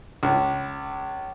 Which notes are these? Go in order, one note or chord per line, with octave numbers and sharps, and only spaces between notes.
C#2